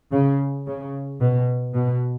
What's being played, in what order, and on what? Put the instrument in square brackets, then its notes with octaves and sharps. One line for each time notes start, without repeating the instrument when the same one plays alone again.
[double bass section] C#3
C#3
B2
B2